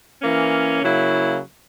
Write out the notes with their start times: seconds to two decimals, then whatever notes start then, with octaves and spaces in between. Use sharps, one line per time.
0.22 E3 A#3 C#4
0.81 C#3 F#3 A#3 E4